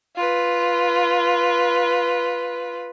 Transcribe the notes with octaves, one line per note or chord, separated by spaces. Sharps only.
F4 B4